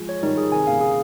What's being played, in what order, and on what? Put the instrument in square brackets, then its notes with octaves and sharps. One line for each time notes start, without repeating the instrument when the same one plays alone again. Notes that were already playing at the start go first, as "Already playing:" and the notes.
Already playing: [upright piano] F3 G#3
[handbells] C#5
[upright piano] D#3 G3 [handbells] D#4
[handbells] G#4
[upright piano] C3 D#3 [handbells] G#5
[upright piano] A#2 C#3 [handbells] F5
[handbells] G#4